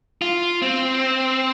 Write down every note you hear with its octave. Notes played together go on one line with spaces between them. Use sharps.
F4
C4